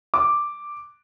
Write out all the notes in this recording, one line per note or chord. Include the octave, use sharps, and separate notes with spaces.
D6